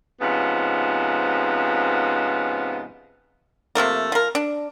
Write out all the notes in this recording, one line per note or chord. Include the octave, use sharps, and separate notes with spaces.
G#2 C3 F3 B3 C#4
C3 F3 A3 A#3
F3 A#4
D4